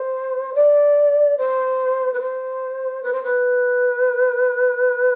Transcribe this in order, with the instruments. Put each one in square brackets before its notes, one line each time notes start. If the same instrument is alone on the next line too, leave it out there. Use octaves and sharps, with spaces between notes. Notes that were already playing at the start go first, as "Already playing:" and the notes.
Already playing: [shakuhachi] C5
D5
C5
B4
C5
B4
C5
B4